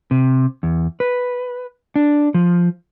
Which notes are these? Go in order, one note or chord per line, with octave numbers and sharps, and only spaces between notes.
C3
E2
B4
D4
F3